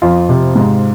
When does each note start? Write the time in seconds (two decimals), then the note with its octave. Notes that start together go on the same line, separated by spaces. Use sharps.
0.02 F2 F4
0.29 C3
0.55 G#2